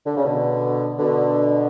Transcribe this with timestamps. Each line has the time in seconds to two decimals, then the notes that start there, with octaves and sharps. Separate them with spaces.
0.06 D3
0.16 C#3
0.26 B2 D3
0.99 B2 D3